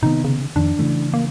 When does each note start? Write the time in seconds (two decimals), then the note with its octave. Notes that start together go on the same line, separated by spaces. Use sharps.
0.03 C3 D#3 B3 D#4
0.24 C#3
0.56 F2 D#3 D4
0.79 C#3 E3 A3
1.14 A#3